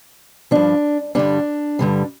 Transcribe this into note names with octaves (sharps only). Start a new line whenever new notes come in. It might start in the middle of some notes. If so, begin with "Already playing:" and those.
G2 F3 D4
G2 D3 G3 D4
G2 D3 G3